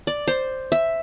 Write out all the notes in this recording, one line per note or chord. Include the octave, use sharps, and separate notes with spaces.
D5
C5
E5